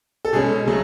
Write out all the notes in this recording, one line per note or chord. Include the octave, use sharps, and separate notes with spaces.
A4
B2 G#3 C#4 G#4
C#3 F#3 A3